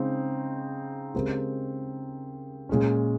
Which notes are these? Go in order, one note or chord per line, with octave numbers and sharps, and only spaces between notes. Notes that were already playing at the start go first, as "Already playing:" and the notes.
Already playing: C#3 G#3 C4 D#4
C#3 G#3 C4 G4 A#4
A#2 G#3 C#4